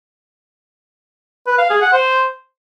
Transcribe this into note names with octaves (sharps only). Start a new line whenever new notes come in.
B4
F5
G#4
F#5
C5